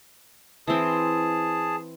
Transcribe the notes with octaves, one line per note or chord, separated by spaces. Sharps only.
E3 C4 G#4 A5